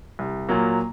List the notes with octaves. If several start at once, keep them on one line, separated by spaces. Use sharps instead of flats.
C2
A#2 F#3 A#3